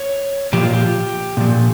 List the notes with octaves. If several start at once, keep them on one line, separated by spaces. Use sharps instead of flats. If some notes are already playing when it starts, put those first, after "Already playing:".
Already playing: C#5
A#2 F3 G4
F4
G4
A#2 F3